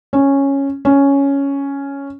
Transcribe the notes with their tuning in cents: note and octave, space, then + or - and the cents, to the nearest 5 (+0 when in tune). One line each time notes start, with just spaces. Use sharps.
C#4 -5
C#4 +5